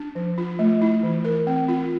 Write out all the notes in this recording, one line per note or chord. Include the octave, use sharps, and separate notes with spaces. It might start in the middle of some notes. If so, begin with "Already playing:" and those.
Already playing: D4
F3
F4
A3
E4
E3
A#4
C4
F4